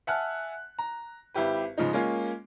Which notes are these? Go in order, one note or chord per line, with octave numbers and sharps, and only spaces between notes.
E5 F#5 G#5 A5 F6 F#6
A#5
G#1 E4 G4 B4
G#2 C#3 F3 D#4
G#3 A#3 C#4 F4